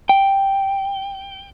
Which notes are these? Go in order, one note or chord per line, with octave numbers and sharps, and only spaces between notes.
G5